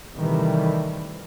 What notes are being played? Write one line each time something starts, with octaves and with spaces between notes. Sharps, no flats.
C3 D#3 E3 G3 A3